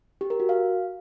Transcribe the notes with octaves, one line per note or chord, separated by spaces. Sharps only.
G4
A#4
F#4
F5